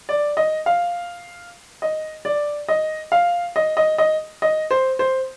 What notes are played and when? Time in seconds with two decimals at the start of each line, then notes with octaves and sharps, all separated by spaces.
0.09 D5
0.37 D#5
0.66 F5
1.82 D#5
2.25 D5
2.68 D#5
3.12 F5
3.56 D#5
3.77 D#5
3.98 D#5
4.42 D#5
4.71 C5
4.99 C5